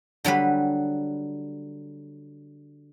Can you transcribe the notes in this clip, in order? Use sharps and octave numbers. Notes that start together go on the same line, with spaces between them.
D3 F#3 G3 B4